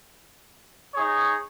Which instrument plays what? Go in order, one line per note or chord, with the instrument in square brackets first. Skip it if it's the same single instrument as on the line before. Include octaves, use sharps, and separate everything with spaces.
[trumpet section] D#4 G#4 C#5